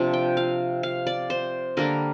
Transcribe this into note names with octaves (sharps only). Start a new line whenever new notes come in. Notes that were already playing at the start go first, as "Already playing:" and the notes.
Already playing: C3 F3 D4
G5
F5
F5
D5
C5
D3 G3 A#3 D4 A#4